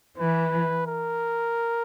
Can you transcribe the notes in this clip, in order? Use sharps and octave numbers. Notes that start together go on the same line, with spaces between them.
E3 B4
A#4